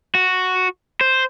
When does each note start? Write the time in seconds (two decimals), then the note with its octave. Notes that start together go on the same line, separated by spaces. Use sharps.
0.15 F#4
1.01 C5